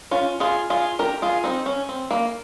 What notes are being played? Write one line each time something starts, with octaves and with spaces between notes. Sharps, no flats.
C#4 F4
F4 G#4
F4 G#4
G4 A#4
F4 G#4
C4 D#4
C#4
C4
A#3